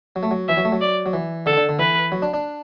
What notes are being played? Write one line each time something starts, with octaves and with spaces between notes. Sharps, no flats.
F#3
A3
F#3
E3 E5
F#3
A3
F#3
D5
F#3
E3
D3 A4
D3
D3
E3 B4
F#3
D4
D4